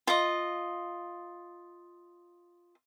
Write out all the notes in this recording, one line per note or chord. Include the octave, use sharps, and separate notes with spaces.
F4 D#5